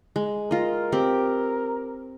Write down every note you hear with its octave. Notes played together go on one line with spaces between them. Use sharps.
G#3
F4 A#4 D#5
C4 G4